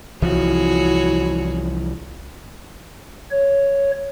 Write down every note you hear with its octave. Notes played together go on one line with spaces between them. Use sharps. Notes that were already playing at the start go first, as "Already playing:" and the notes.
C2 E3 F3 E4 F#4 G#4 C#5
C#5